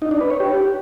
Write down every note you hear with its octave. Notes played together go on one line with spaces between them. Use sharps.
D#4
D4
B4
C#5
G4